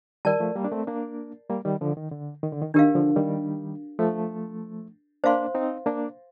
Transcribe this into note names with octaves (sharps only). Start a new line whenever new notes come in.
D#3 G3 A#4 D5 A5
F3 A3
G3 A#3
D4
A3 C4
A#3 D4
G3 A#3
D#3 G3
D3 F3
D#3
D3
D#3
D3
D#3
D#3 D4 G4 A#4 F5
D3 F3
D#3 G3
F3 A3
A#3 D4 C5 F5 C6
C4 D#4
A#3 D4